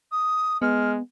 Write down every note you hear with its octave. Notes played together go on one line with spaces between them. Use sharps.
D#6
G#3 B3 F6